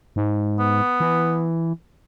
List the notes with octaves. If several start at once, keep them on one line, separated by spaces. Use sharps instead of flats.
G#2
B3
E3